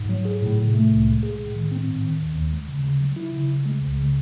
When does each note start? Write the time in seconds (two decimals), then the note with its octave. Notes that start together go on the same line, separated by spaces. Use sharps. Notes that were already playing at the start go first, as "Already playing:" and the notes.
Already playing: G#2
0.09 F#3
0.25 G#4
0.42 A2
0.58 C3
0.74 A3
0.90 C2
1.07 G#3
1.23 G#4
1.39 A2
1.55 D#3
1.72 C4
1.87 G#2
2.03 D#3
2.20 D#2
2.35 D#2
2.52 G#3
2.68 C#3
2.84 C#3
3.01 F#3
3.16 E4
3.33 C#3
3.48 C#3
3.65 G#3
3.81 C#2
3.97 C#3